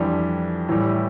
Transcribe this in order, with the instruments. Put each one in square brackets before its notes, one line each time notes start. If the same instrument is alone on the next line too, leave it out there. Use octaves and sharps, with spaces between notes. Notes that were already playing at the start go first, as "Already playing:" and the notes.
Already playing: [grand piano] F2 E3 G3 D4
A2 E3 G3